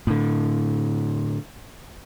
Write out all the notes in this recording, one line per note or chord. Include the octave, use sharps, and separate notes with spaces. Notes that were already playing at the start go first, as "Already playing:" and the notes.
A2 D3